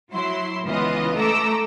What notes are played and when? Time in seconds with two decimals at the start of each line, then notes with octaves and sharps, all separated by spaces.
0.12 F#3 E4 C6
0.64 C#2 E3 B3 F4 D#5
1.16 A3 A4 A#5 D6 E6